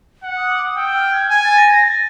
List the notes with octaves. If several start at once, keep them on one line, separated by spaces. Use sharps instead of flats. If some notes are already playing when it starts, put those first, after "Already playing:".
F#5
D#6
D6
D#6
G5 E6
F6
G#6
G#5 G#6
A6
A#6
A#6
A6